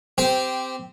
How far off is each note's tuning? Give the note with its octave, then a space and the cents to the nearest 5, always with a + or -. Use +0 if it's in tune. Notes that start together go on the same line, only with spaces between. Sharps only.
C4 -15 G4 +0